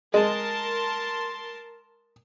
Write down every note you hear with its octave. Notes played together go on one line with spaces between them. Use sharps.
G#3 A#4 A5 C6